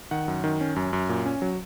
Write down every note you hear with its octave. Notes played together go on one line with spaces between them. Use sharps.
D#3 F#5
F#2
D#3
C#4
F#2
F#2
A#2
C#4
F#3